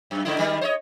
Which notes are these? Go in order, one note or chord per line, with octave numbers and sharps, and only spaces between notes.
F#2
G#2 D3 E4
D#3 G3 G#3
C5 C#5 D#5